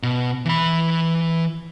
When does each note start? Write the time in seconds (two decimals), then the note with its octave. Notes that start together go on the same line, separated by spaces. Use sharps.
0.03 B2
0.45 E3 B5